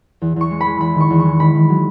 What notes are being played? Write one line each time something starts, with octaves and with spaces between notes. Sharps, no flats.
E2
E2 C#6
G#3
B5
G#3
E2 B5
D#3 C#6
E2
C#6
G#3
D#3 B5
D#3
F#3